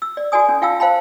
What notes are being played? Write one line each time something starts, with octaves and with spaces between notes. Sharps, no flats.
E6
D5
F#4 A4 D5 G#5 D#6
C#4
F4 F5 G5 A5 E6
C5 F5 G5 A5 B5